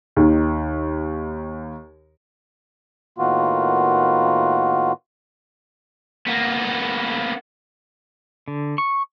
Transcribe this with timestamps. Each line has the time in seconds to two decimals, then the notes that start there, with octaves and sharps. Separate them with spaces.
0.16 D#2 D#3
3.18 A2 D#3 A#3 B3 F4 F#4
6.27 A#3 B3
8.48 D3
8.78 C#6